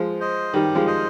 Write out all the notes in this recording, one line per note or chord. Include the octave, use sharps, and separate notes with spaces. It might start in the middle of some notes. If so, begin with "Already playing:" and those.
Already playing: F3 G#3
C5 D#5
D#3 G3 G4
F3 G#3
C5 D#5